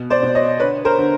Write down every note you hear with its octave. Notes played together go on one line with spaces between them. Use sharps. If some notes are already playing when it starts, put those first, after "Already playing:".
Already playing: B2
C5 D5
B2
C#5 D#5
D3 B4 C#5
A#4 C5
D3